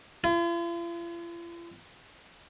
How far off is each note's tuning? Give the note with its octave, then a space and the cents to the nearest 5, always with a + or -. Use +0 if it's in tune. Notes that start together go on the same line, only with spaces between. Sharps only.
F4 -45